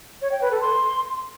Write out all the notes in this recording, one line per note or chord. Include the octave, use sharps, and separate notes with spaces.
C#5
G5
B4
A4
C6